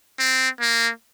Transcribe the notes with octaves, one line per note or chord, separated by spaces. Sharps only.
C4
A#3